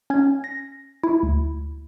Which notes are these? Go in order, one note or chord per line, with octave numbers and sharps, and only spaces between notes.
C#4 G#6
A#6
E4
D2